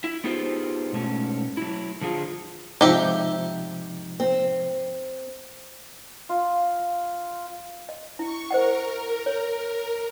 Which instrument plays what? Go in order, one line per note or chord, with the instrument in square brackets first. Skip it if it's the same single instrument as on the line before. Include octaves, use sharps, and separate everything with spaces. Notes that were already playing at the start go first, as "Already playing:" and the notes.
[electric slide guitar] E4
B3 D#4 F4 G4 G#4 C5
G#2 B2 A3 C#4
F#3 E4
D3 F3 F4 G#4
[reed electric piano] G#2 C3 F3 [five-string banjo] D#4 G4 E5
[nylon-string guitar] C4
[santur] F4
[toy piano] D#5
[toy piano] E4 [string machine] C#6
[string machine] A#4 [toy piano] C5 D#5 F#5
[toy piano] C#5